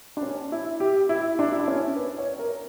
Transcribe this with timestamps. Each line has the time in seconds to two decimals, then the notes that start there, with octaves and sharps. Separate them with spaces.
0.17 D4
0.23 C#4
0.52 E4
0.80 G4
1.09 E4
1.39 D4
1.52 E4
1.59 D4
1.68 C#4
1.96 B4
2.18 C#5
2.39 A#4